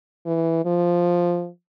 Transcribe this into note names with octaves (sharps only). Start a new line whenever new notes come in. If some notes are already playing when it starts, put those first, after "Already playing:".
E3
F3